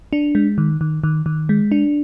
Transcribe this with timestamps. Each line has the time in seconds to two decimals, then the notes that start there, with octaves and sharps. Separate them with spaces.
0.13 D4
0.35 G#3
0.58 D#3
0.81 D#3
1.04 D#3
1.26 D#3
1.49 G#3
1.72 D4